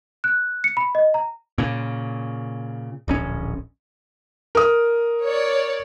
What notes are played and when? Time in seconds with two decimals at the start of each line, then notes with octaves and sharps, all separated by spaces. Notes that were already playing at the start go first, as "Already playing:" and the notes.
0.24 F#6
0.64 C#7
0.77 B5
0.95 D#5
1.14 A#5
1.58 A#2 C#3
3.08 D1 A#1 C#4
4.55 A#4 D#6
5.24 C#5 D5